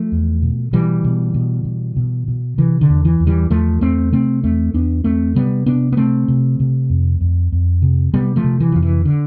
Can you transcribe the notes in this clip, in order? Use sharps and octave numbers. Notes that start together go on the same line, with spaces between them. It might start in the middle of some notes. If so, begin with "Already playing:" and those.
Already playing: F3 A3
E2
B2
B2 E3 G3
B2
B2
B2
B2
B2
C3 E3
D3
E2
E3
E2
E3 G3
E2 F3 A3
E2 A3 C4
C3 A3 C4
E2 A3 C4
E2 B3 D4
E2 A3 C4
C3 G3 B3
C3 B3 D4
B3
C3 A3 C4
C3
C3
F2
F2
F2
C3
C3 G3 B3
F3 A3
C3
E3
F2 F3
E3
D3